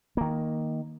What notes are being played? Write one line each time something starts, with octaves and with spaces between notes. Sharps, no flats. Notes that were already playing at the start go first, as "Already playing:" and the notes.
D#3 A#3